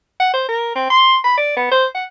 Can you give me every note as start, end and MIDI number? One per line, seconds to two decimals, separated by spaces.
0.20 0.31 78
0.34 0.44 72
0.49 0.73 70
0.75 0.90 60
0.90 1.18 84
1.24 1.36 83
1.38 1.56 74
1.57 1.68 59
1.72 1.86 72
1.95 2.05 78